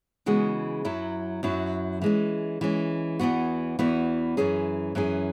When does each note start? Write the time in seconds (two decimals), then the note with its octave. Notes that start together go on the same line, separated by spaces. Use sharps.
0.26 C#3 E3 G#3 B3 F#4
0.85 F#2 F#3 E4
1.43 F#2 F#3 E4
2.02 E3 G#3 C#4
2.61 E3 G#3 C#4
3.19 E2 E3 B3 F#4
3.79 E2 E3 B3 F#4
4.37 F#2 E3 C#4 G#4
4.95 F#2 E3 C#4 G#4